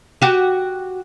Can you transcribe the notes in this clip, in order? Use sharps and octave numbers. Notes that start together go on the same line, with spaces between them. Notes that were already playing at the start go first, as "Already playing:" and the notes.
F#4 G4